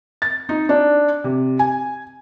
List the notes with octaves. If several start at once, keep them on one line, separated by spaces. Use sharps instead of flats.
A6
D#4
D4
C3
G#5